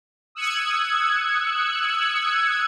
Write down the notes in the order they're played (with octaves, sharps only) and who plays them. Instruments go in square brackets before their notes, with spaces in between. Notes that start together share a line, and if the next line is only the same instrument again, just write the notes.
[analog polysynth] D#6 E6 F#6 G#6 C#7